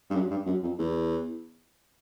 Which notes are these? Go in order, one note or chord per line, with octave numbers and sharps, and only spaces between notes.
G2
F#2
G2
F#2
F2
E2